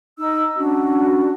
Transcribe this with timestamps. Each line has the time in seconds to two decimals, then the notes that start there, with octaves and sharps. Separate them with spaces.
0.17 D#4 E6
0.57 C#4 D4 F#4